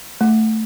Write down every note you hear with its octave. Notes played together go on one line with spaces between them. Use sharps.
A3